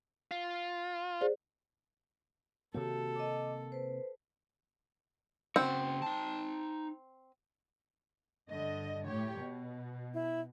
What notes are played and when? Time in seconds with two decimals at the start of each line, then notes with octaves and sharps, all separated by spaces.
0.31 F4
1.21 G#4 C5 D5
2.74 C3 D#3 A#3 F#4 G4 A4 C#5
3.15 D#5 D6
3.72 B4 C5
5.56 C#3 C4 F#4
6.02 D#4 A5
8.50 G2 D3 D#5
9.07 A2 G4 C#5
9.39 B2
10.14 E4